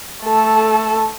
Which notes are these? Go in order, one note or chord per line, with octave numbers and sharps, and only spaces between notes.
A3 A4